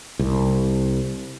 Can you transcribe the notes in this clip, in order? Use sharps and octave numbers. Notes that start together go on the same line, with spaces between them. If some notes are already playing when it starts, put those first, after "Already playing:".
C2